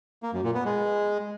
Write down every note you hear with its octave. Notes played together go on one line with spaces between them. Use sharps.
A#3
F#2
A#2
B3
G#3